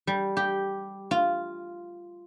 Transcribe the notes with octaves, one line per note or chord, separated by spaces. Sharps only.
G3
G4
F4